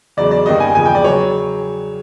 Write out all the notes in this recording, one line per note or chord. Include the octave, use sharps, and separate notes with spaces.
E2 C#3 F#3 D5
D5
G2 D#3 G3 A#3 D#5
G#5
E2 C#3 F3 G#3 G#5
G5
D5
C#3 F#3 C#5